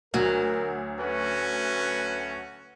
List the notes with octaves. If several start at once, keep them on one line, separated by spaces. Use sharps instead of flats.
D2 F#3 A#4
A3 C#4 F#4 B4